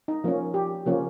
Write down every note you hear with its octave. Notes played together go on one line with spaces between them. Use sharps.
D#4
F3 A#3 C#4
G4
C#3 F3 A#3 C#4